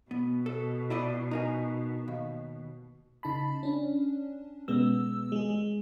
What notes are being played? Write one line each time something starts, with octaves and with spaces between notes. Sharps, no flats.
B2 B3
A4
E4 D5 D#5
D#4 A#4 G#5
D#2
C#3 D#4 A5 B5
C#4 D4
B2 G#3 B3 E6
G#3 G#4
G#3